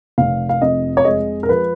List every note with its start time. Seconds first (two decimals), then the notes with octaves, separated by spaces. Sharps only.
0.18 F1 F5
0.49 F5
0.62 F2 D#5
0.97 C#5
1.05 G#3 D#5
1.43 A#4
1.49 F3 B4